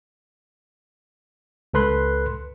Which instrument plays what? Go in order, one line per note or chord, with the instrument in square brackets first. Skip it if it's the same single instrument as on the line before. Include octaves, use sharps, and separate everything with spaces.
[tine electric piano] C#2 A4 B4 C6 F#6